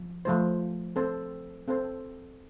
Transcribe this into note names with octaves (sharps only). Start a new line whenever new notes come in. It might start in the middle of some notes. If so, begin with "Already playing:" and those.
Already playing: F3
F3 A3 F4 C5
C4 A4 C5
C4 A4 C5